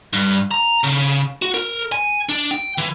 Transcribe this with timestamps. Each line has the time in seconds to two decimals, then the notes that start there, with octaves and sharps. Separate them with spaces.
0.13 G2
0.51 A#5
0.84 C#3
1.42 F#4
1.54 A#4
1.92 G#5
2.29 D4
2.51 G5
2.78 E3